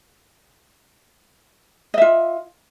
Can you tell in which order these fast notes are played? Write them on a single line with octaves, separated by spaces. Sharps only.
D#5 E5 F4